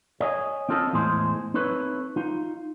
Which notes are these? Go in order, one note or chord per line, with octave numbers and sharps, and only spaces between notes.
C#5 D#5 G#5
C4 C#4 F4 A4 D#5
E2 A2 G#3 G#4 C5
C4 D#4 E4 A4 B4 C#5
D#4 F4